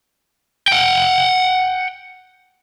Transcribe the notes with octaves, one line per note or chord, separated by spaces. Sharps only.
F#5 G5